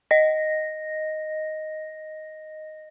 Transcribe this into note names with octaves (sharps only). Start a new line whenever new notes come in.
D#5 A#6